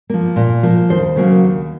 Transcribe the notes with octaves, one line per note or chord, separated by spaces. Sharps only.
F3 A#3
A#2
F3 A#3
D#2 C5
C#3 F#3 A#3
D#2